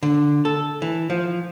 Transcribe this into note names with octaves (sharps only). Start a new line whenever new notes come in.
D3
A4
E3
F3